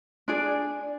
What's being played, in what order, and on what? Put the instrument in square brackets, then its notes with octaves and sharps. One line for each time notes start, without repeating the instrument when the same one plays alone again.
[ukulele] D4 G#4 D5